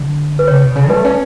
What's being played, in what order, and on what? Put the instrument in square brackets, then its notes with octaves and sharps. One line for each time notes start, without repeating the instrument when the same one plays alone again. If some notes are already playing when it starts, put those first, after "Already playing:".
Already playing: [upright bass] D3
[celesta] B4
[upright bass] C#3 [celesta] C#5
[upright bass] B2
C#3
[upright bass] A3 [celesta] B4
[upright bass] C#4